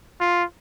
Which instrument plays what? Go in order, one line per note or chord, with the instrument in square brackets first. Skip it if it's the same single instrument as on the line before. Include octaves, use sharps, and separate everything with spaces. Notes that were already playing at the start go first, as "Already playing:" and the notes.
[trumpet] F4